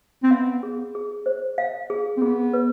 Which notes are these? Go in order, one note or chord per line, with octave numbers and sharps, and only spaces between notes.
C4
B3 F5
G#4
G#4
C5
F5
G#4
C4
B3 G#4
B4